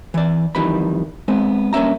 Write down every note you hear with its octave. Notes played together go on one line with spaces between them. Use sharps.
E3 D5
F2 D#3 E3 G3 B5
G#3 B3 C4
G2 A#3 C#4 E5 A#5